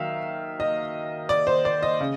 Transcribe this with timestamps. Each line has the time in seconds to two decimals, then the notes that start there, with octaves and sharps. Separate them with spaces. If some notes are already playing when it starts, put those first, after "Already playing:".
Already playing: D#3 F#3 E5 F5
0.60 D#5
1.29 D5
1.47 C5
1.65 D5
1.82 D#5
2.00 C#3